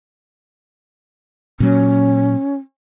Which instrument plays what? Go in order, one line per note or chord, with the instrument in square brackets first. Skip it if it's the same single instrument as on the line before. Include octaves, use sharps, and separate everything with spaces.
[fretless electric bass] A#2 F#3 [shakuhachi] C#4